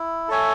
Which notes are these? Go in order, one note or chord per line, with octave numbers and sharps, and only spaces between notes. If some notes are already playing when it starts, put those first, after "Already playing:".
Already playing: E4
A4 C#5 E5 G#5